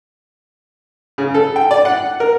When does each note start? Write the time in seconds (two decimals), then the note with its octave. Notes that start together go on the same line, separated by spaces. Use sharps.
1.18 C#3
1.34 A4
1.56 G5
1.71 D5
1.85 F#5
2.20 A#4